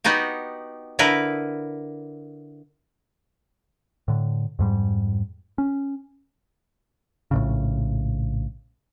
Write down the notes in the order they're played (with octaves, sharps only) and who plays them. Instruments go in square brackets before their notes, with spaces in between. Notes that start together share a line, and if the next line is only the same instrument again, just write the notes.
[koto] B3 D#4 F#4 G4
D3 E4 A#4 B4
[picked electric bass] A2 D3
F2 G#2 G3
C#4
A#1 A2 C#3